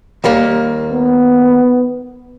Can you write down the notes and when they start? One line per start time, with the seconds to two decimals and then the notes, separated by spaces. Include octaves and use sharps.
0.24 D#2 G3 A#3
0.91 B3